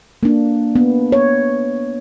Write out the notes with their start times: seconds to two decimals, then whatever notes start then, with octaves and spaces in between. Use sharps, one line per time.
0.23 A#3 D4
0.75 B3
1.12 C#5